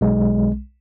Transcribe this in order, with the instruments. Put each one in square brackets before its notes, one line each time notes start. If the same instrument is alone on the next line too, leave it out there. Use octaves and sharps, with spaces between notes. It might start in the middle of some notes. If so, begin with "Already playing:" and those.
[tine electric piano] B1 G#3